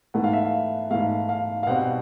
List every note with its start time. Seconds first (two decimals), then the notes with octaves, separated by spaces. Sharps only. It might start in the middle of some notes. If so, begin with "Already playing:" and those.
0.14 G#2 E3 A3 F#5
0.24 F5
0.33 E5
0.43 F5
0.91 G#2 E3 A3 F5
1.29 F5
1.63 F5
1.66 B2 G3 C4 F#5